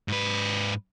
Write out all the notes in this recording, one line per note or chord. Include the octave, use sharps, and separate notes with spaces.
G#2 B4